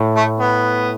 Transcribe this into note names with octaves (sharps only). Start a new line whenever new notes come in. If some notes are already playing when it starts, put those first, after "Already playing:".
Already playing: A2
A3
B3